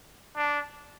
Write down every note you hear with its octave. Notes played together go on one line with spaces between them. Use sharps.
D4